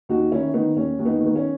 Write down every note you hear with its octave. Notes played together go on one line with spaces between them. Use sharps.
D#2 D#4 F#4
D#3 C#4 E4
D#3 B3 D#4
D#2 C#4
D#2
B3 D#4
D#3
B3
C#4